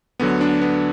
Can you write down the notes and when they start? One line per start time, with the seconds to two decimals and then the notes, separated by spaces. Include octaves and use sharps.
0.20 D2 D3 F#3 B3
0.41 D4
0.62 B3